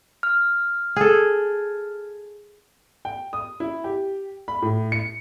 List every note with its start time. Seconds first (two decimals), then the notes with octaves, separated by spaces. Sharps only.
0.23 F6
0.96 G#4 A4
3.05 G5
3.33 D#6
3.60 E4
3.84 G4
4.48 B5
4.62 A2
4.92 C#7